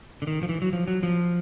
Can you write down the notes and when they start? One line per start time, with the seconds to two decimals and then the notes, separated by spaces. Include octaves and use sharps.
0.22 D3
0.27 D#3
0.43 F3
0.49 E3
0.62 F#3
0.73 F3
0.88 F#3
1.03 F3